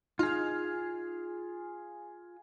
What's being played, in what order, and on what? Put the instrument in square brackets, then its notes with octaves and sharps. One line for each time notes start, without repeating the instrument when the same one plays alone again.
[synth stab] D#4 F6 [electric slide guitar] F4 G#4